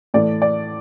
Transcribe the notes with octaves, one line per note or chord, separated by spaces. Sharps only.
A2 E3 A3 D5
D5